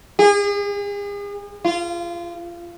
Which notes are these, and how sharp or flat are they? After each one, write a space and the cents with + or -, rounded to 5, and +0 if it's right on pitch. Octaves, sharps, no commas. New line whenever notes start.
G#4 -40
F4 -25